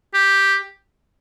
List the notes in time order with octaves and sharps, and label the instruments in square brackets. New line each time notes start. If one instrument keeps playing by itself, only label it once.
[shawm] G4